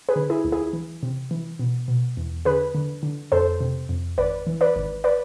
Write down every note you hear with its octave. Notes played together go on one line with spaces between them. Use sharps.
G#4 B4
D3
E4 G#4
D2
E4 G#4
E3
C3
E3
B2
B2
E2
D3 G#4 B4
D3
D3
F2 A4 C5
C3
F2
G#1 B4 D5
E3
B4 D5
G#1
B4 D5